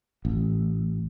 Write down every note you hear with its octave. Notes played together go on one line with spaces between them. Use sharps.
A1